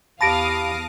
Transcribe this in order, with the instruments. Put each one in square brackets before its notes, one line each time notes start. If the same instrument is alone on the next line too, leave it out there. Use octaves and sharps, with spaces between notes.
[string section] E2 F5 D#6 [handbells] G4 B5 [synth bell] A5 A#6 D7